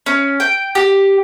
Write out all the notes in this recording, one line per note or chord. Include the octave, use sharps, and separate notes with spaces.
C#4
G5
G4